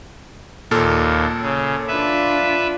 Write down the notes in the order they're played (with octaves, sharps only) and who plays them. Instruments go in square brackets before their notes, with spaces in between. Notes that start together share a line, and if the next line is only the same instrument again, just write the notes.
[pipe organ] D#2 [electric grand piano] A#2 A4 F6
[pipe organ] C#3
[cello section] D4 F4 [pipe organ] B4 E5